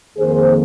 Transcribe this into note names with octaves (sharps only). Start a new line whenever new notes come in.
F2 D#3 A#3 G#4 C5